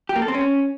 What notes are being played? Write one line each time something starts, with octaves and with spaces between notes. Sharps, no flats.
G4
A#3
A4
C4
C#4